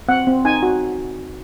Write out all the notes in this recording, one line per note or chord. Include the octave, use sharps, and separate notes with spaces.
C4 F#5
C4
D#4 G#5
F#4